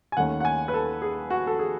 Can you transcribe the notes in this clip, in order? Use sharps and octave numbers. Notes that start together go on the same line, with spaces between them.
G#5
D#2 D#3 A3 C#4 F#5
F#5
G#5
B4
A4
G#4
F#4
A4
G#4